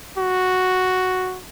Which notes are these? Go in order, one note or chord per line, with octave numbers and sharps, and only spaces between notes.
F#4